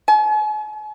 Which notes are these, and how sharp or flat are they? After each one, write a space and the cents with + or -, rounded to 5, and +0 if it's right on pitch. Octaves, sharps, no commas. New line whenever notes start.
G#5 +45